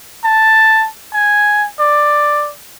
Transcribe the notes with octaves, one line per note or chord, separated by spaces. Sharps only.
A5
G#5
D5